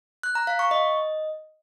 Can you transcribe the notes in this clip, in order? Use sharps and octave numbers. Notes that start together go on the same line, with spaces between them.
F#6
A#5
F5
C#6
D#5